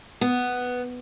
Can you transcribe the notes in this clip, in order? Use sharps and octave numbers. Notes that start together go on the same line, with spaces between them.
B3